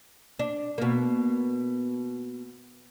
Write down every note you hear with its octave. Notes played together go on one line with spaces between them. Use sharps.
D4
B2 A#3